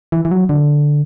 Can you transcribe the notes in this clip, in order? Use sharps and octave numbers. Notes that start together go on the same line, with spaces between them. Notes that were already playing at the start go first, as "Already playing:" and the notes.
E3
E3
F#3
D3